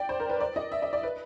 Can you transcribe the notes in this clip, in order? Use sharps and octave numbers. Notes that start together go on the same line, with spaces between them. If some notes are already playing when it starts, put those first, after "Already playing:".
Already playing: D5 G5
C5
A#4
B4
D5
D#5
E5
D#5
D5
B4